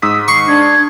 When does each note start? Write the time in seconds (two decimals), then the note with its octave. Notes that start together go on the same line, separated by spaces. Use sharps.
0.02 G#2 D#6 E6 B6
0.28 C#6 C7
0.48 D4 G#6